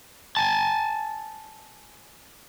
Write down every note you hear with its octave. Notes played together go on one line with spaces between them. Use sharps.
G#5 A5